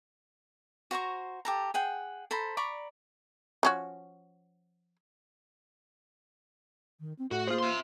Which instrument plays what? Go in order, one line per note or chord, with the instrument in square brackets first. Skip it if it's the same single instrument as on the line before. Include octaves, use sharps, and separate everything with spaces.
[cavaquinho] F#4 C5 A#5 C#6
G4 A4 A#5
G#4 F#5 G5
A4 C5 A#5 B5
D5 A#5 B5 C#6
[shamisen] F3 C#4 F#4
[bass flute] D#3
C4
[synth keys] A2 [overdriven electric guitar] F#4 [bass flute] F#5
[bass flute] A#3 [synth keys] F4 C5 [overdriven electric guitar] G#4
[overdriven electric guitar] E5 C6